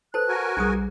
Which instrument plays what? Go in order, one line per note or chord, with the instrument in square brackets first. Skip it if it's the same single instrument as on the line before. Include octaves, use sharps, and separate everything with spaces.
[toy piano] A4 B4 C5 [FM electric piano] A5 [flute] F#6
[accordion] F#4 A#4 G#5
[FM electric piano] B1 G3 [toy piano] D4 G#4 D#6